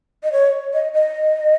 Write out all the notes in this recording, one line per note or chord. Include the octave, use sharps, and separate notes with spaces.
D#5
C#5
D#5
D#5